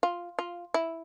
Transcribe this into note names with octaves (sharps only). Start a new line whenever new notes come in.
F4
F4
E4